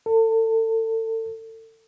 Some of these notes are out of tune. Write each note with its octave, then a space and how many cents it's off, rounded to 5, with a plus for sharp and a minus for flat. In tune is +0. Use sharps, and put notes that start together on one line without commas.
A4 +30